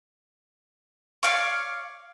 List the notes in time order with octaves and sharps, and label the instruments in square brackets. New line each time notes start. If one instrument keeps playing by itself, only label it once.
[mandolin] C#5 D5 F5 C#6